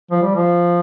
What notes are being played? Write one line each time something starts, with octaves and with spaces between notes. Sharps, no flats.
F3
G3
F3